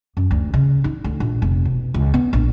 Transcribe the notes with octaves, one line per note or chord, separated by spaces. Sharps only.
F#2
D2
C#3
D#4
D2
A#1
F1
B2
C#2
B3
A#1